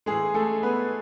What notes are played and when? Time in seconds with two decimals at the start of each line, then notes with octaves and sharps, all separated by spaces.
0.06 A2 E3 G#3 G#4
0.34 A3 A4
0.63 B3 B4